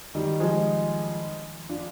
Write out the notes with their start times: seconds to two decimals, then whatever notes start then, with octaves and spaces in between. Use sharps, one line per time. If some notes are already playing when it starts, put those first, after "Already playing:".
0.15 D#3 G3
0.40 F3 G#3
1.69 D4 F4